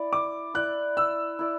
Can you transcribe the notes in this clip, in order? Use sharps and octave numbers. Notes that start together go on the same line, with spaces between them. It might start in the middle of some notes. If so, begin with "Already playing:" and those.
Already playing: E4 D5
D6
E4 D5 F#6
E6
E4 D5